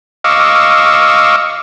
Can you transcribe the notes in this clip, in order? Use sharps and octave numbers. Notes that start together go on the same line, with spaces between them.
D#5 F5 C#6 D6 E6